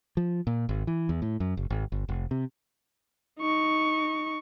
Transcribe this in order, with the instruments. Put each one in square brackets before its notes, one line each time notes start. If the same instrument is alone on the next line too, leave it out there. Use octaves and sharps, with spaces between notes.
[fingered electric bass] F3
A#2
G#1
E3
E2
A2
F#2
F#1
G#1
G1
F1
C3
[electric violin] D#4 C#6